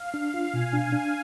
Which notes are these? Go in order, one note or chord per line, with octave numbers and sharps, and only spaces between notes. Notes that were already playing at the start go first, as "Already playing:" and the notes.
Already playing: F5
D4
F4
B2 G#5
D4
D4